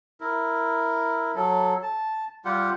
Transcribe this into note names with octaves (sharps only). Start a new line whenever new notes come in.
E4 A#4
F#3 A4
A5
G3 F4 G4 F#5